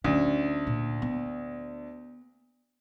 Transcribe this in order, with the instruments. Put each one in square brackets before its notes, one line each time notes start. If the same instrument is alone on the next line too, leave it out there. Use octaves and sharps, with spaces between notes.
[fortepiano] D2 [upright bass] C#4
[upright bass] A#2
B3